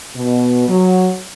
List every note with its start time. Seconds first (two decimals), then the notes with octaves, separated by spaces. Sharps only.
0.16 B2
0.68 F#3